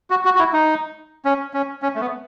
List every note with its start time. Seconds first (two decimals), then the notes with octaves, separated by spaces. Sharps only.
0.10 F#4
0.25 F#4
0.35 F#4
0.39 E4
0.53 D#4
1.25 C#4
1.53 C#4
1.82 C#4
1.95 A3
2.01 B3